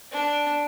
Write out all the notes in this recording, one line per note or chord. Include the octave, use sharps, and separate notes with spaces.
D4